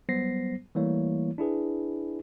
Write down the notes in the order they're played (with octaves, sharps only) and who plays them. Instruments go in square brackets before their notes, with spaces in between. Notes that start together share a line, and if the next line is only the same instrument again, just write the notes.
[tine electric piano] F#3 G3 B3 C5 A#6 C7
E3 G3 A3 A#3 E4 C#5
D4 E4 G#4 B4